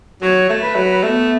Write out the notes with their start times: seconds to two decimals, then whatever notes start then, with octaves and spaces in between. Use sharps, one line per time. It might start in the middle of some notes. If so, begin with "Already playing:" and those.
0.22 F#3 C#5
0.49 A3
0.62 B4
0.75 F#3
1.03 A3 B3